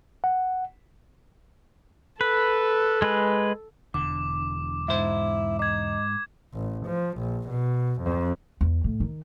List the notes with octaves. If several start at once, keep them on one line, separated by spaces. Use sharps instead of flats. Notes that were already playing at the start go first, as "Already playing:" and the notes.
F#5
A4 B4
G#3 B4
E1 D3 D6
G#2 E4 C5
D#4 D6 G#6
A1
F3
A#1
B2
F2
E2
A2
D#3